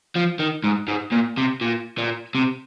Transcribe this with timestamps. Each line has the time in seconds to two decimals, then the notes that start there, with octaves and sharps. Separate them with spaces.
0.15 F3
0.39 D#3
0.64 G#2
0.88 G#2
1.12 A#2
1.38 C3
1.61 A#2
1.98 A#2
2.35 C3